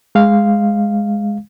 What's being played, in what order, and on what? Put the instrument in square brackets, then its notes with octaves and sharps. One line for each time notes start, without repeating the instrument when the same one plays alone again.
[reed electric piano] G#3 F5